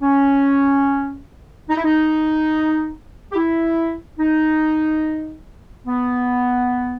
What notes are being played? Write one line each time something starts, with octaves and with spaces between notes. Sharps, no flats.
C#4
D#4
E4
D#4
G4
E4
D#4
B3